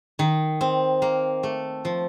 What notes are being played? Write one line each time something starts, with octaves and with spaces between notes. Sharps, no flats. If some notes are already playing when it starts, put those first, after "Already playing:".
D#3
C4
A#3
A3
F3